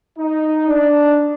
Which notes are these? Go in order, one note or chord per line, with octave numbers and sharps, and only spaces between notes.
D#4
D4